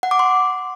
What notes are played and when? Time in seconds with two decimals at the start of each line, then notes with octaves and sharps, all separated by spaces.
0.03 F#5
0.11 D6
0.19 C6